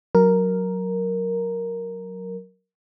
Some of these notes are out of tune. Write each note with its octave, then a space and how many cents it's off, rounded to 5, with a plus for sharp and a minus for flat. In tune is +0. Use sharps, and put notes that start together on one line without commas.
F#3 +0 A#4 +0